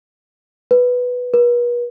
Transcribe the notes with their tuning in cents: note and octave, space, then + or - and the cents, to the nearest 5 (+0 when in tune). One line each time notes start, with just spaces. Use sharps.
B4 +0
B4 -40